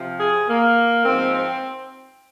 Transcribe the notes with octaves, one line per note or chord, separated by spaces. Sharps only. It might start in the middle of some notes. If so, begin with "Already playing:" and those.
Already playing: C3 F3
G#4
A#3
G#2 F3 C4
C4